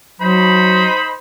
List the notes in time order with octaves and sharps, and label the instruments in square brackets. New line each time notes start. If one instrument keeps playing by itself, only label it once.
[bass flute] F#3 [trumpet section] D#4 C5 B5